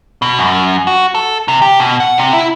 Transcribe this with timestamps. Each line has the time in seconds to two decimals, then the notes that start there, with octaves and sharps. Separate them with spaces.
0.22 B2
0.39 F#2
0.87 F#4
1.15 A4
1.48 C3
1.62 G4
1.80 B2
2.00 F#5
2.18 C3
2.33 E4